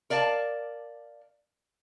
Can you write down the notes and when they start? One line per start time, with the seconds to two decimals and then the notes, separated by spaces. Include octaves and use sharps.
0.10 A#4 D5 F5 G#5 A5